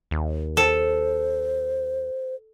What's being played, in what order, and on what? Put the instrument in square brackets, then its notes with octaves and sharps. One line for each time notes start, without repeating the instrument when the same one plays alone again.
[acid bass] D#2
[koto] A4 [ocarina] C5